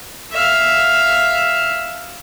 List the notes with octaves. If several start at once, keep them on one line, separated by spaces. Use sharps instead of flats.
E5 F5